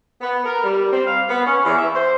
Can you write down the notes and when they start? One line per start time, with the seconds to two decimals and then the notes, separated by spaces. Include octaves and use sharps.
0.21 B3
0.45 A#4
0.64 G3
0.92 C4
1.06 F5
1.29 B3
1.46 C#4
1.64 E2
1.77 E5
1.94 C5